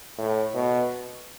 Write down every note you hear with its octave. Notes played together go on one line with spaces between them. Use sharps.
A2
B2